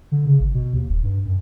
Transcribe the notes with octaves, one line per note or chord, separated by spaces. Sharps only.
D3
C#3
G#1
B2
D#2
D#1
G2
F#2